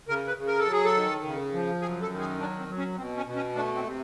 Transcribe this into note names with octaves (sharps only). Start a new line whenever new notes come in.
C#3 A#4
B4
C#3
A#4
A4
F#3
G#4
A4
D#3
C#3
F3
F#2 G#4
A4
D#3
G#4
F#3 D4
C4
F#3
C#4
B2 C4
C#4
B2
C#4
A3 D4
C4
C3